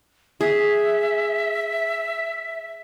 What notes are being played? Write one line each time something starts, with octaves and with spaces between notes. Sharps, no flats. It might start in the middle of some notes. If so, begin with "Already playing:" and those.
G#4 E5